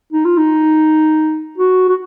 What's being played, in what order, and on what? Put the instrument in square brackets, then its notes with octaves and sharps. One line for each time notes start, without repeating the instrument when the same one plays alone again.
[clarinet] D#4
F4
D#4
F#4
F#4